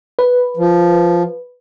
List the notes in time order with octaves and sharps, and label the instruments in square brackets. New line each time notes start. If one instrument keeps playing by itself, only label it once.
[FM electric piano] B4
[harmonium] F3